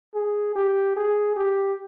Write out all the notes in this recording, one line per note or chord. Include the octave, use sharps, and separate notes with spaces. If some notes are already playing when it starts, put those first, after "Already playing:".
G#4
G4
G#4
G4